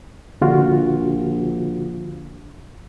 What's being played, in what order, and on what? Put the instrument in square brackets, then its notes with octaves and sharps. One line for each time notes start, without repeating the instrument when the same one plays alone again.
[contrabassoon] A#1 [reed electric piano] D3 F4 F#4